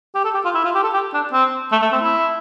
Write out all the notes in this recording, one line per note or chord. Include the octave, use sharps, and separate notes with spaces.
G4
A4
G4
F4
E4
F4
G4
A4
G4
D4
C4
A3
A3
C4
E4